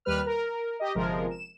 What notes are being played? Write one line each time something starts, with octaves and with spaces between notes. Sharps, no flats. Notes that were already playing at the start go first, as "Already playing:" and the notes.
D#2 G3 B4 F6
A#4
G4 D#5
G1 C3 F3 G#3 A#4
E7